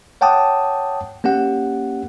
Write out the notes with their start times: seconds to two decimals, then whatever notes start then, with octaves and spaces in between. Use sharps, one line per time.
0.21 C#5 F#5 G5 A5 D6 D#6
1.24 A#3 C#4 G4 F#5